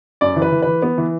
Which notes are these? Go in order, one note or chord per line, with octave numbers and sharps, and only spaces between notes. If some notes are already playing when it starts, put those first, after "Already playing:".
F#2 D5
E3
B4
E3
E3 B4
B3
E3